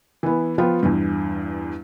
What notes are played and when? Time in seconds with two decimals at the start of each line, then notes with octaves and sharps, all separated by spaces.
0.23 E3 B3
0.58 F3 B3 F4 G5
0.83 E2 G2